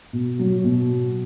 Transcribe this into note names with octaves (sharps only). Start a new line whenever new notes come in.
B2
F#3
B2